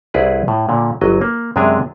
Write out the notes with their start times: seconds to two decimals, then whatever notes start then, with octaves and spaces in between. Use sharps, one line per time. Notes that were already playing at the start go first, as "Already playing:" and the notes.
0.14 C2 E4 G#4 B4 D5
0.48 A2
0.69 A#2 D3
1.01 G1 F#3 D#5
1.21 A#3
1.56 F#2 C3 G#3 D4 G#5 A#5